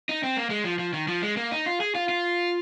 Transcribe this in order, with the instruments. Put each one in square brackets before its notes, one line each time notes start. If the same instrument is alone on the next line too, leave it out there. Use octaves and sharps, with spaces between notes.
[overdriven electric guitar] D#4
C4
A#3
G#3
F3
F3
D#3
F3
G#3
A#3
D#4
F4
G#4
F4
F4